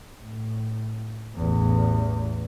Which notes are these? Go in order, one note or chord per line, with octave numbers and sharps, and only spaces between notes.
A2
A1 E2